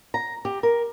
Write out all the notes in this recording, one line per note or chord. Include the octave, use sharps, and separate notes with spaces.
A#5
G4
A#4